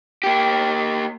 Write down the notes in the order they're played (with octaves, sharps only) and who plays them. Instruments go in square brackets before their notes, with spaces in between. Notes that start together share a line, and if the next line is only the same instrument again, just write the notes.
[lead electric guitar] A#3 G4